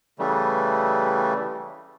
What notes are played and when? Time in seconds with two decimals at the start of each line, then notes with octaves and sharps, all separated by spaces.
0.19 C#3 E3 G3 A3